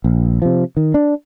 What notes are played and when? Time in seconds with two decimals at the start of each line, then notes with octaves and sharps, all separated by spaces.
0.04 A#1
0.42 C3 F3
0.77 D#3
0.94 D4